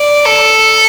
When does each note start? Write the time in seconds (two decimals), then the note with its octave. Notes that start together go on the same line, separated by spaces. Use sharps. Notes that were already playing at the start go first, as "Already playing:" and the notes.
Already playing: D5
0.26 A4